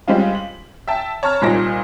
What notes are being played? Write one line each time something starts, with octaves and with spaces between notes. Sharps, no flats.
G3 G#3 C4 C#4 F4
F#7
E5 G5 A5
C#5 A5 A#5 F6
C2 A#2 D#4 C5 A#6 D7